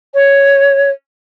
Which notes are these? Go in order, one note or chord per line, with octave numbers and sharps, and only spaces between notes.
C#5